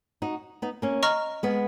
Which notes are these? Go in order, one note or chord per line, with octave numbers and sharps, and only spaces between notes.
D#4 F#4
B3 D#4
A#3 C#4
D#5 A#5 C#6 F6
G#3 B3